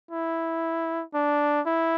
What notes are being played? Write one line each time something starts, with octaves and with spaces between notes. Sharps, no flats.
E4
D4
E4